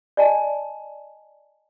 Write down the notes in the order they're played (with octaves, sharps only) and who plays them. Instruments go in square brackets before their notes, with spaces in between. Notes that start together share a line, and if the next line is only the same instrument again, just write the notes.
[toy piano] D5 D#5 G#5 A5